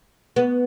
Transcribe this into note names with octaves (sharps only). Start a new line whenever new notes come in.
B3